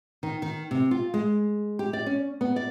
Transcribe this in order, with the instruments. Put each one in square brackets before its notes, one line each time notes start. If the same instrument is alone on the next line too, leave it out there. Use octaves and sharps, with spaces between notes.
[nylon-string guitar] D#3
D#3
C3
F4
G#3
G4
D5
C#4
B3
D5